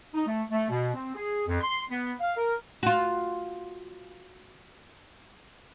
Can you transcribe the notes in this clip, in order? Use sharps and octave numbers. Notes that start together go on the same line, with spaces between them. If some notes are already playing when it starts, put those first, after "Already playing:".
D#4
A3
A3
B2
C4
G#4
F2
C6
B3
F5
A#4
F4 F#4